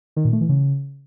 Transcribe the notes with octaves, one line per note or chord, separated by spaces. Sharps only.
D#3
A#2
A3
E3
C#3